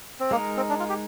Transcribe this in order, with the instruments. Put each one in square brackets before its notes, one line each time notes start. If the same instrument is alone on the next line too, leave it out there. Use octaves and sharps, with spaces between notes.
[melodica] C4
[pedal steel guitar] G#3 D#4 A#4 [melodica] A#3
[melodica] C4
D4
F4
G4